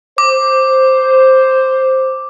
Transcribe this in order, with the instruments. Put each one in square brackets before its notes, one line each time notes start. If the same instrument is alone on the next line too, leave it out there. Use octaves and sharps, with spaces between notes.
[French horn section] C5 [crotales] D6